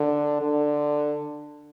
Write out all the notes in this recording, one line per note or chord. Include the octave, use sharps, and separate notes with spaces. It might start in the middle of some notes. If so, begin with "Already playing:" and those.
Already playing: D3
D3